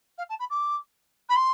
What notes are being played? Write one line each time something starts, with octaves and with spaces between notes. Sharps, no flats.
F5
A5
B5
D6
B5
C6